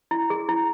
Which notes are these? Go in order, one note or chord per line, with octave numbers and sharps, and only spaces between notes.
E4
G#4
E4